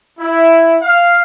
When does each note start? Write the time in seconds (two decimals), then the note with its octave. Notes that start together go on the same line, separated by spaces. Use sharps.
0.18 E4
0.81 F5